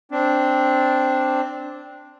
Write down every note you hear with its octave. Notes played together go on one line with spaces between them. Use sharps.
C4 D4